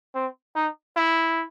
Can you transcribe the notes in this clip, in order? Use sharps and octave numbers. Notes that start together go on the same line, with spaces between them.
C4
D#4
E4